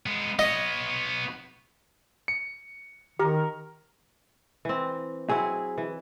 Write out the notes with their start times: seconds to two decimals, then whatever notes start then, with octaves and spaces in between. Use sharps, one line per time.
0.06 G#3 B3
0.39 B3 C#5 D#5
2.28 C#7
3.19 D#3 G4 A#4
4.65 E3 C4
5.29 F#3 C4 E4 G#4
5.78 E3